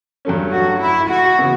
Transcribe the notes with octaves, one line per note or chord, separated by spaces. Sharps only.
G2 F#3 A3 C#4
F#4
E4
F#4
C#3 E3 B3 E4